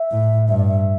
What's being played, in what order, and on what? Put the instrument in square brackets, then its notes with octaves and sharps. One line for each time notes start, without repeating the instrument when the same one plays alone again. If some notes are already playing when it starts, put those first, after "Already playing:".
Already playing: [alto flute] E5
[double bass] A2
[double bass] G2 [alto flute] E5
[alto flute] D5
E5